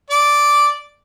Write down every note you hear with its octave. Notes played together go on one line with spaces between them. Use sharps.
D5 D6